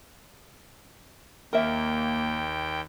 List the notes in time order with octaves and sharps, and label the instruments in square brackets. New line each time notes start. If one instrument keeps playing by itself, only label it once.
[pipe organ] D#2 G5 [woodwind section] A#3 [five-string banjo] A#4 E5